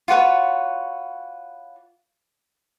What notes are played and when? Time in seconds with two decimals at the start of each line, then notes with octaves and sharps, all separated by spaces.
0.08 F4 F#4 B4 C#5